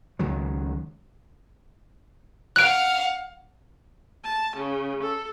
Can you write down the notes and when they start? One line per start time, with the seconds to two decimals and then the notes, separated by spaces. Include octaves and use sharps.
0.19 C#2 D#3 F#3
2.56 F5 F#5 F#6 D7
4.22 A5
4.54 C#3
5.00 A4